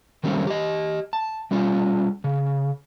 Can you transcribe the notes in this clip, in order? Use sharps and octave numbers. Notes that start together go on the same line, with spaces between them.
D#3 F#3 G3 A3 C4 C#4
G4 D#5
A5
G3 C#4 F4
C#3